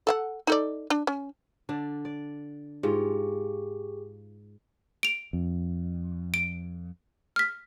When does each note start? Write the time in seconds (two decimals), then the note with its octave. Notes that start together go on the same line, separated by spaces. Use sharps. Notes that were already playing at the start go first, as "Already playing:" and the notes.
0.07 A4 F5 F#5
0.47 D#4 A4 D5
0.90 D4
1.07 C#4
1.69 D3 D4
2.05 D5
2.83 G#2 F4 G4 G#4
5.03 D7 F7
5.33 F2
6.34 D7
7.36 F6 B6